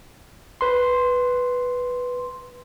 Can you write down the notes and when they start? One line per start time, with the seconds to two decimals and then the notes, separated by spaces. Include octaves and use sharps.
0.61 B4 C6